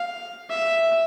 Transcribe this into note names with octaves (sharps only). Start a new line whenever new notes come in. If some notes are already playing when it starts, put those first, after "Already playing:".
Already playing: F5
E5